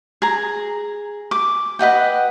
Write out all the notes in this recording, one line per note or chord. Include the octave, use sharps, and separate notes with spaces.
G#4 A#5
D6
B4 D#5 F#5 G5